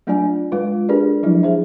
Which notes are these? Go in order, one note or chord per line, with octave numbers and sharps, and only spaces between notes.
F#3 A3 D4 F4 D5 G#5
G#3 F4 B4
D4 G4 G#4 A#4 B4 D5
F3 F#3 D4 E4
G#4 C5 E5